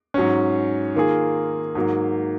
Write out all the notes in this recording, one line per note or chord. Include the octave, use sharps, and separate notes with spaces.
G#2 F#3 C#4
D#3 A#3 F4 G#4
G#2 F#3 A#3